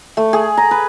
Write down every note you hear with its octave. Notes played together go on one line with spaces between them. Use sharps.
A3
G#4
A#5
B4